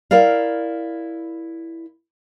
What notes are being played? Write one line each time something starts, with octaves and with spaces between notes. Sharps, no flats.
E4 A#4 D5 F5